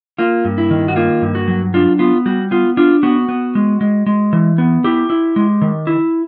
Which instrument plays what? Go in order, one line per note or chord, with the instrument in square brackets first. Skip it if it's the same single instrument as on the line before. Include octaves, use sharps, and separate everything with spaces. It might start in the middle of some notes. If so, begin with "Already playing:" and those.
[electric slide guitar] A#3 F4
G2
E4
D#3
F#4
A#3 F4
G2
F#4
F#3
D4 F4
B3 F4
G3 F#4
B3 F4
D4 F4
B3 F#4
B3
G#3
G#3
G#3
E3
B3
E4 G4
E4
G#3
D#3
E4